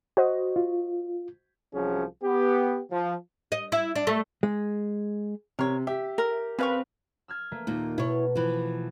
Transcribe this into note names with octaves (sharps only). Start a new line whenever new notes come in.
F#4 C5 D#5
F4
C2 F3 F#3 C#4 G#4
B3 G4
F3
D#5
E4
D4
A3
G#3
C3 A#4 C#5
G4 E5
A#4
C#3 C4 B4 F5 C#6
E6 F6 G#6
A3 A#3
D#2 A#2
B2 E4 C#5
E3 F3